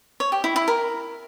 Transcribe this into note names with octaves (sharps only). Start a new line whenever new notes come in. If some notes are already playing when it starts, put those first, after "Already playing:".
C#5
G4
E4
E4
A#4